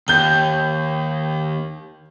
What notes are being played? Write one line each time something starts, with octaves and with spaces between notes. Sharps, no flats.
D#2 G6 G7